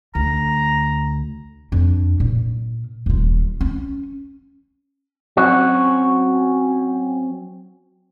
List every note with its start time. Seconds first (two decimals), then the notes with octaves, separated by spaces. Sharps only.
0.15 D2 A#5
1.72 F2 D4
2.20 A#2
3.06 D#1 F4
3.61 C#4
5.37 F#3 C4 C#4 F#4